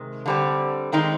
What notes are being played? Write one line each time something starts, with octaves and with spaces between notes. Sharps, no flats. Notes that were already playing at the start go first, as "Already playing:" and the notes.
Already playing: C3 D#3 G#3
D3 G3 C4
D#3 G#3 C4 D#4